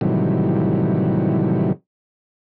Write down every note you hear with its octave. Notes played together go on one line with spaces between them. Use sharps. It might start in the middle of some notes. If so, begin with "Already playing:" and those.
A2 C3 D#3 E3 F#3 G3